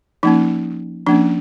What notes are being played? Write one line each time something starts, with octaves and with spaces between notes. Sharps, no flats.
F3 A#3 C#4 D#4
F3 A#3 C#4 D4